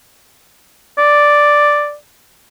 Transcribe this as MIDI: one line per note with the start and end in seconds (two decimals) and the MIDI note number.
0.98 1.95 74